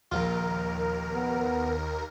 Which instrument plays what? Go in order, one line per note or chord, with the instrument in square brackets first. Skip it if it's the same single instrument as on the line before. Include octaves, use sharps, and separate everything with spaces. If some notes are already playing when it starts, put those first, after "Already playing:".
[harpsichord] A#1 F4 [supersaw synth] D#2 A#4
[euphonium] B3